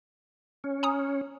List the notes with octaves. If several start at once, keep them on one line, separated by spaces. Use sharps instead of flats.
C#4
G#5 A#5 D#6